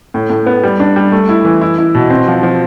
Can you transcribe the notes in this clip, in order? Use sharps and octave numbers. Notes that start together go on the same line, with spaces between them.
A2
A2
B3
G3
D4
G3
A3
E4
E3
E4
E4
B2
C4
F3
F3